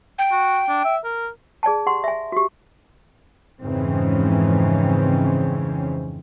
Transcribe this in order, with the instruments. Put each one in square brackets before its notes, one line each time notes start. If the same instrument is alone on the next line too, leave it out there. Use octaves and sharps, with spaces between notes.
[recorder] G5
[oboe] F#4
D4
E5
A#4
[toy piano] G#4 D5 G#5 A5
G4 F#5 C6
E5 G#5
F#4 G4
[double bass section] F2 G#2 C#3 E3 C4 C#4